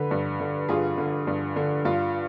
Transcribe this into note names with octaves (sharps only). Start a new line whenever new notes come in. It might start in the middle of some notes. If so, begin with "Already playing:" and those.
Already playing: D3 B4
G2
D3
G2 F4 G#4
D3
G2
D3
G2 F4